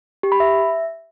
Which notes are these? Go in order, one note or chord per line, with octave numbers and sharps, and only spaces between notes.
G4
B5
E5